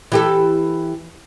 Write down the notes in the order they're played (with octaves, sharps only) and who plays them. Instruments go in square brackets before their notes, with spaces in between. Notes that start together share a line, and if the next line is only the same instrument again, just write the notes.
[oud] E3 G4 A4